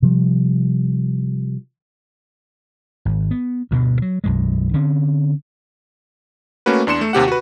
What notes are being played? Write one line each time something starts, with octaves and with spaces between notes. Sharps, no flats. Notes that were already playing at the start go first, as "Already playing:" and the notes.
C3 F3 G3
G#1
B3
D2 G2 B2
F#3
B1 F#2 G#3
D3 C4 C#4
A3 A#3 C#4 F#4 B4
E2 D4 C6 C#7 E7
A3
D#2 C3 G4 F#5
F#4 B4